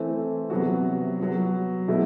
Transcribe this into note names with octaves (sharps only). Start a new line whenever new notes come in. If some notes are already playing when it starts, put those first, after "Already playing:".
Already playing: E3 A3 C4 E4
C3 F#3 B3 F#4
F#3 B3 F#4
B2 F#3 A3 E4